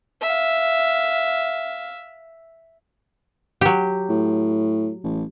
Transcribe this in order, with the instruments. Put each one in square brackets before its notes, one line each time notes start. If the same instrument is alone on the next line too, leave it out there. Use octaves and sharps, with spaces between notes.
[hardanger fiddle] E5 F5
[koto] F#3 G4
[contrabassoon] A2
A1